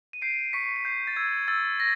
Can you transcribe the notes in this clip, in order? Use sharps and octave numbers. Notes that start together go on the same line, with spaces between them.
D#7
G6 C7 D7
C#6 B6 C#7
B6
G6 C7
A6
E6 G#6
E6 A6
A#6